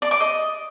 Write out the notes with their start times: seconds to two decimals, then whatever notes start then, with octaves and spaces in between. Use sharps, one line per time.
0.02 D5
0.11 D6
0.20 D#5